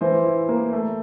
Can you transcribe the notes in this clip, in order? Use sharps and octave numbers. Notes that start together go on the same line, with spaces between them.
E3 C5
E4
A#3
A3